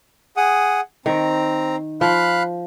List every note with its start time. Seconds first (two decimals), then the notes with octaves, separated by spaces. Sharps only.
0.37 G#4 F#5 D#6
1.06 D#3 C4 A#5
2.01 F3 F5 B5 F#6